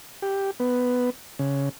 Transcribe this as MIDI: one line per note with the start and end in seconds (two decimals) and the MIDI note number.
0.22 0.51 67
0.60 1.10 59
1.39 1.69 49